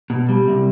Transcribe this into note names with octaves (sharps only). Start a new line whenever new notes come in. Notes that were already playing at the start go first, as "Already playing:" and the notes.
B2
G3
C3